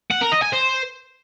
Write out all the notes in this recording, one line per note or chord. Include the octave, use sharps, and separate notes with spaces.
F#5
A#4
D#5
G#5
C5